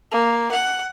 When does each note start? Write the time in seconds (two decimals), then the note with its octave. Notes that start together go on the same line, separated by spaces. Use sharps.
0.11 A#3
0.52 F#5